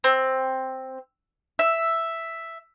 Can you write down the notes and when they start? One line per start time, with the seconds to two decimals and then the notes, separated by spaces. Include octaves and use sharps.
0.04 C4
1.59 E5